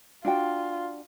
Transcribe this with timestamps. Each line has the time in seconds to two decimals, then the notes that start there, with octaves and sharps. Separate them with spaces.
0.25 D4 F4 F#4 G5